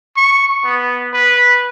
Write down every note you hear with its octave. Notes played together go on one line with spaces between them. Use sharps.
C#6
B3
B4